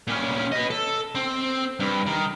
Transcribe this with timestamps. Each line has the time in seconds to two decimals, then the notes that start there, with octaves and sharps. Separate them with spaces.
0.08 A#2 C#4
0.52 B4 D#5
0.70 A4
1.15 C4
1.80 G2
2.06 D#3